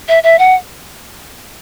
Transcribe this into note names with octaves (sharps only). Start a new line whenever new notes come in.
E5
E5
F#5